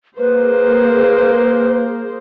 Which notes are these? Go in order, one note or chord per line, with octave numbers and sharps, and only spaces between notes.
A#3 G#4 B4 C5